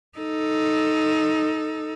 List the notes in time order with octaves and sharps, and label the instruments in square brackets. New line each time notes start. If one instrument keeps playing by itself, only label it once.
[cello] D#4 A4